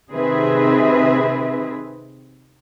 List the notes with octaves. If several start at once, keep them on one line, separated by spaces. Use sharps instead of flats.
C3 D#3 C4 G#4 B4 E5